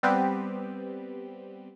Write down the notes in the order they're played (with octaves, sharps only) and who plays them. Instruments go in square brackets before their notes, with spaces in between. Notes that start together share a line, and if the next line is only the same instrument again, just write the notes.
[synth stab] G3 B3 C4 G4 B4